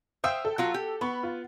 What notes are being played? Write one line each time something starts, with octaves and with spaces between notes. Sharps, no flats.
C5 E5 F5 G5 D#6 E6
A4
F#3 F4 F#4
G4
B3 B5 C#6
F4